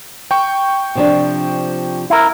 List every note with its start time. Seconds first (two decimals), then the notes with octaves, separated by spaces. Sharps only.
0.31 G5 C#6
0.95 C3 F3 D4
2.10 E4 A#4